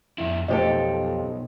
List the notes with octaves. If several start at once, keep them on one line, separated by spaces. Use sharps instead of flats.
F2 E4
B1 F2 D#4 G4 A4 C5 D#5